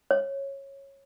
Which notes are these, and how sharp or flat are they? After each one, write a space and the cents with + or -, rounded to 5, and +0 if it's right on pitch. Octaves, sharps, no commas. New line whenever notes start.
C#5 -15